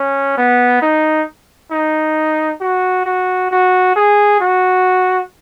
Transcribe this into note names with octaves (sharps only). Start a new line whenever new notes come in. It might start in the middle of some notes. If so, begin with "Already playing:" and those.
Already playing: C#4
B3
D#4
D#4
F#4
F#4
F#4
G#4
F#4